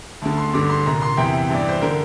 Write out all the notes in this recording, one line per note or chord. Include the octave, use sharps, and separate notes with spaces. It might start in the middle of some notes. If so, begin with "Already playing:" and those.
D2 D3 A5
C6
G2 D3 D6
C6
C2 A#2 A#5
C6
E2 C3 E3 G5
G2 E3 D5
C5
D3 A#4